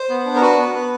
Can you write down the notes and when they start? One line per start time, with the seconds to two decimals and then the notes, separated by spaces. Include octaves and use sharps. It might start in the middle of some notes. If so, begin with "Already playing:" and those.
Already playing: C5
0.09 B3
0.26 D4
0.35 A#4
0.41 F#4 B4
0.58 B3
0.74 B3